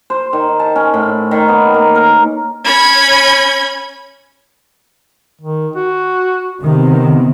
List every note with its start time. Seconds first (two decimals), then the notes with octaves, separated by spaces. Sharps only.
0.10 C5
0.33 D#3
0.60 A5
0.76 C#4
0.94 A2
1.31 D#3
1.48 B3
1.74 A#3
1.95 A#4
2.64 C#4 B5 G#6
5.41 D#3
5.76 F#4
6.63 C3 D#3 B3 C4